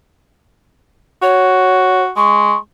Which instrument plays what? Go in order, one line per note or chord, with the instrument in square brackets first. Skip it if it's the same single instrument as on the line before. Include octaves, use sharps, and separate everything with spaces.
[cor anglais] F#4 [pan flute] C#5
[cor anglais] G#3 [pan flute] C#6